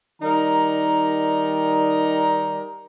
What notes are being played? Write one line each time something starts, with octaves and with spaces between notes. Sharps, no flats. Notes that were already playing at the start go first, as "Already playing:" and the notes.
D#3 G3 D#4 A#4 D5 A#5